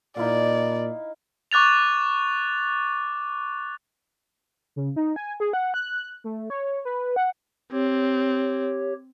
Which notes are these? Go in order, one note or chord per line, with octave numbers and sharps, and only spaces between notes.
A#2 D#4 E4 D5 F5
C#6 D6 F#6 A6 F7
C#3
D#4
G#5
G#4
F#5
F#6
A3
C#5
B4
F#5
C4 G4 C#5